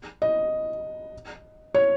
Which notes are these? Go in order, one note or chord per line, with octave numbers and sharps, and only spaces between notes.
D#5
C#5